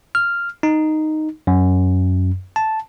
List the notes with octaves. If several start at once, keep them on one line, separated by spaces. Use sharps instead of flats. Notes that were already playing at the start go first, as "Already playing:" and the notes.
F6
D#4
F#2
A5